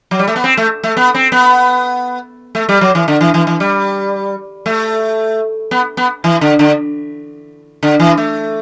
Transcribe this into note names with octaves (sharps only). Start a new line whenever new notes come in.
F#3
G3
A3
B3
C4
A3
A3
B3
C4
B3
A3
G3
F#3
E3
D3
E3
E3
E3
G3
A3
B3
B3
E3
D3
D3
D3
E3
A3